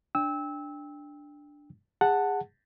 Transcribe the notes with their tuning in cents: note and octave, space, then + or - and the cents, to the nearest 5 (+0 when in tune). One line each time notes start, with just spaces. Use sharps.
D4 +0 G5 +20 E6 -25
G#4 -25 F#5 +0 A5 +15